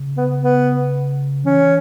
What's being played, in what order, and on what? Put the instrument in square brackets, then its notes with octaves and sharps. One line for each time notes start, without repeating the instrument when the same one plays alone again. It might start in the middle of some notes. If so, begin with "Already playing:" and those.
Already playing: [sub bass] C#3
[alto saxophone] B3
B3
[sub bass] E3 [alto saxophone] C#4